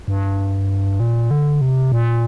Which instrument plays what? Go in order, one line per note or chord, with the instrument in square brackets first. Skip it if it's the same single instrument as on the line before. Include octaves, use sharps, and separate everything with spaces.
[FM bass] G2
A#2
D3
C3
A#2